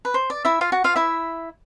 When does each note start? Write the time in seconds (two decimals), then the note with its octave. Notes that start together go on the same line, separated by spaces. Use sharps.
0.05 B4
0.14 C5
0.30 D5
0.45 E4 E5
0.61 F4 F5
0.72 F#4 F#5
0.84 F4 F5
0.96 E4 E5